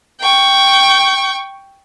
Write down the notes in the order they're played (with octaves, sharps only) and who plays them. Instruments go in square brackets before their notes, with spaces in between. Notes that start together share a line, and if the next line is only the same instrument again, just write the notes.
[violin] G5 C#6